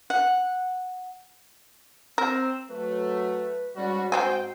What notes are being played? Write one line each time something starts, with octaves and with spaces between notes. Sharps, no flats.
F#5
C4 A#4 E6
F#3 A3 B4
G#2 G3 C#4 F#4
G#2 F#3 C4 C5 G5 G#5